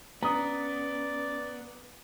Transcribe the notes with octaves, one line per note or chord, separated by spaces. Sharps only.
B3 C#4 D5 A#5 D#6